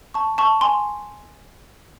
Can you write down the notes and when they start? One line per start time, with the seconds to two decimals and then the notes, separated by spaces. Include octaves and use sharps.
0.14 A5 C#6
0.38 A5 C#6
0.61 G#5 C6